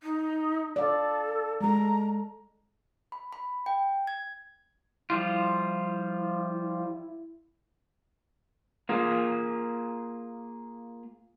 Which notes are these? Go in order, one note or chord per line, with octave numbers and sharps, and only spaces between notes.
D#4
A4 D5 F5
G#3 A4 A#5
B5
B5
G5
G#6
F3 G3 E4 F4
A#3 F4 G#4